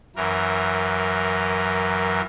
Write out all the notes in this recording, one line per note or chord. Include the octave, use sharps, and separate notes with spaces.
F#2 E3 A#4